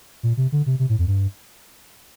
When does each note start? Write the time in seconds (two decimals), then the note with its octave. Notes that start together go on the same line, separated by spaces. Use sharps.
0.23 A#2
0.37 C3
0.52 D3
0.66 C3
0.79 C3
0.89 A2
0.99 F2
1.07 G2